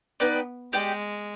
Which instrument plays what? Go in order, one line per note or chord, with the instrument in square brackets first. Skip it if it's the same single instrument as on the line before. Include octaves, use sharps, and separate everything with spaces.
[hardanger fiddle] B3 [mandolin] D#4 B4 D5 G5
[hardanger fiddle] G#3 [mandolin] G4 D5 G5